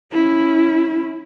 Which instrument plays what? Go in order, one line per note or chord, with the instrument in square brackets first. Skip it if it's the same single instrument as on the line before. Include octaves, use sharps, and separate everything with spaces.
[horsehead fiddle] C#4 E4